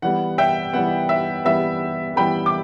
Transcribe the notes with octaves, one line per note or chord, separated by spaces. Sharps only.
E3 G3 B3 F#5
E5 G5
E3 G3 B3 F#5
E5
E3 G3 B3 E5
E3 G3 B3 G5 B5
D6